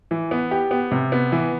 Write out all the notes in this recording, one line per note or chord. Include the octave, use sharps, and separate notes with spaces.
E3
B3
G4
B3
C3
B3
E3